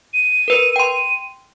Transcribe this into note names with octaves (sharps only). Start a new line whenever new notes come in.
D#7
A#4 B4
G5 C6